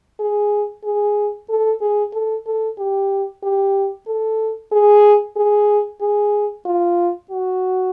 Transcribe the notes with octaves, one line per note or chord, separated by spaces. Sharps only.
G#4
G#4
A4
G#4
A4
A4
G4
G4
A4
G#4
G#4
G#4
F4
F#4